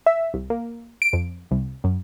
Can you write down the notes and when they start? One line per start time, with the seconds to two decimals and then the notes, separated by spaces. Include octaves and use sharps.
0.06 E5
0.34 C2
0.50 A#3
1.02 D7
1.13 F2
1.51 C2
1.84 F#2